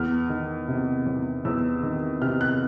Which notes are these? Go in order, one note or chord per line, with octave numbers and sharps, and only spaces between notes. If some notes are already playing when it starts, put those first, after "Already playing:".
Already playing: E2 F6
D#3
C3
E2
E2 E6
D#3
C3 F6
F#6